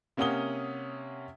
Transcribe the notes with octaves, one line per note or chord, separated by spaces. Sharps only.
C3 A#3 C#4 F#5 D#6 G7